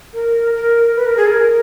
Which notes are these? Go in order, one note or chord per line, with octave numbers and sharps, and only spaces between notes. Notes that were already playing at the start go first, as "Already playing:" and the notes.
A#4
A#4
B4
A#4
G#4
A#4